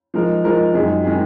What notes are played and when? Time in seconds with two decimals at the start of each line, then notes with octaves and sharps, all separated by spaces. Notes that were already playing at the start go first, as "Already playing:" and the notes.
0.14 F3 G#3 D#4 A#4
0.44 F3 G#3 D#4 A#4
0.74 F#2 D#3 G#3 D#4 G#4
1.04 D#3 G#3 D#4 G#4